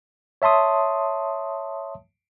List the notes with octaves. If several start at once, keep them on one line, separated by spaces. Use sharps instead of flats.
C#5 E5 A5 C6 D#6